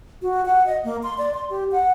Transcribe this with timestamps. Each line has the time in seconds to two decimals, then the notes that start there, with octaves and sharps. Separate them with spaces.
0.22 F#4
0.46 F#5
0.66 D#5
0.84 A#3
1.03 C6
1.18 D5
1.34 C6
1.50 G4
1.72 F#5